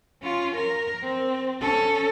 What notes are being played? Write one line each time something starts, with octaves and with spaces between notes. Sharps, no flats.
C#4 F4
A#4
C4
C#4 A4